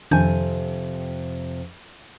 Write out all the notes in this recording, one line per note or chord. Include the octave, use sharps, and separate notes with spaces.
F2 C3 D#3 D4 G#5 G6